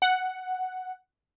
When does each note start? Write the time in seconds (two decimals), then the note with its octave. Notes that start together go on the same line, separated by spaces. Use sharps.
0.02 F#5